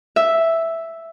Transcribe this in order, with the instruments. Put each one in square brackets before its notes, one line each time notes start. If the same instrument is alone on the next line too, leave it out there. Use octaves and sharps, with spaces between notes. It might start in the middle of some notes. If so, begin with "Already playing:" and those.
[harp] E5